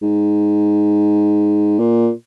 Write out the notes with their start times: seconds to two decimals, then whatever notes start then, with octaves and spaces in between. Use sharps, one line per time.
0.02 G#2
1.79 A#2